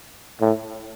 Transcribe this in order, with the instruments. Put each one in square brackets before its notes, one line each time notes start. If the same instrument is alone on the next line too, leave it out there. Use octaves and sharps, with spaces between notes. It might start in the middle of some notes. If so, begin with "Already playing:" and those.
[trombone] A2